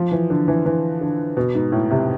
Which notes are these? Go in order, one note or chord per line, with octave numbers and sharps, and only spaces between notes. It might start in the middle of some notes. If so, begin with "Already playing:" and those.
Already playing: F3
E3
D3
E3
E3
D3
B2
G#2
A2
C3